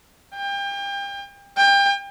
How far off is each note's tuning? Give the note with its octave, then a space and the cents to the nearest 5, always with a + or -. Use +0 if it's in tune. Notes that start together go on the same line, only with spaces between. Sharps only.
G5 +35
G5 +30